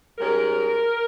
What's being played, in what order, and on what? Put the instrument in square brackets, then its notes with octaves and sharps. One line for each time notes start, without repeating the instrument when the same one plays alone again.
[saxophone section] G#2 G3 C#4 A#4